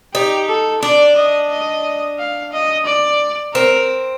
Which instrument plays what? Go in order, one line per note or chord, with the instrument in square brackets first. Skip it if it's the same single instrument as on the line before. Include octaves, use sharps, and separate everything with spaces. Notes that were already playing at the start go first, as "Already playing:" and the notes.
[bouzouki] D#4 [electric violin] G4
[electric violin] A4
[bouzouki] D4 [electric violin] D5
[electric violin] D#5
D#5
F5
D#5
D5
[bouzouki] C4 [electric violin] A#4